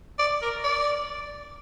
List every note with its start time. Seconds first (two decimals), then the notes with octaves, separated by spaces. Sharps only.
0.19 D5
0.42 A#4
0.64 D5